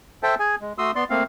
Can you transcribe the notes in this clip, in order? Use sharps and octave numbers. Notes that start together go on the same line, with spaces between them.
A4 C5 E5 G5 A5
G#4 G#5
G#3
A3 F#4 C6 D#6 E6
B3 D5 C6
A3 A#3 C4 F5